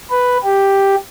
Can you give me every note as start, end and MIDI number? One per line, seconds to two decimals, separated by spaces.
0.10 0.37 71
0.43 0.95 67